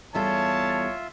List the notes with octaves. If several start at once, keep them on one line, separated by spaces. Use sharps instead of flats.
E2 G3 F4 A4 C#5 E5 A5